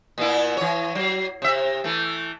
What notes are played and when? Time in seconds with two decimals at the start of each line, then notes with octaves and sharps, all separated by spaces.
0.18 A#2 B3 E4
0.57 E3 C#5
0.95 F#3
1.42 C3 E5
1.84 E3 A3